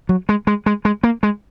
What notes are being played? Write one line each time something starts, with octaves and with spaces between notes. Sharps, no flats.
F#3
G#3
G#3
G#3
G#3
A#3
G#3